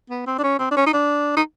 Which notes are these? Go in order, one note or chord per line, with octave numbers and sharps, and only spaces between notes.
B3
C4
D4
C#4
C4
D4
C#4
D#4
D4
D#4